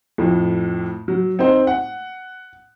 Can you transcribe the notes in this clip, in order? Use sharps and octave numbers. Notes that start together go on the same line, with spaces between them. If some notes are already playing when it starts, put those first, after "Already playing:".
F2 A2
F#3
C4 D#4 C5
F#5